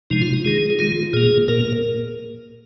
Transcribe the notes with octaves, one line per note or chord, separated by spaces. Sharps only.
C3 F3 G#3 D#4
F4
D#4
D#3 G#3 G#4
G#4
D#3 G#3 F4
A#2 A#3 G#4
A#2 A#3 A#4